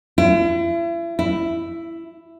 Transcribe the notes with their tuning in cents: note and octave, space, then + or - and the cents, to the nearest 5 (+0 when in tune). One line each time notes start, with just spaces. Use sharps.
E4 +40
E4 +10